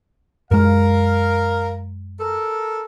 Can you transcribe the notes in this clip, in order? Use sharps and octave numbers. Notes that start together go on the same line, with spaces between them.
F#2 G#3 A#4 F5
A4 A#4